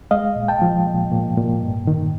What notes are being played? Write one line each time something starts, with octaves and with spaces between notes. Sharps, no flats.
G#3 D#5 F5
A#2
G5 A5
F3
A#2
A#2
A#2
G2
D#3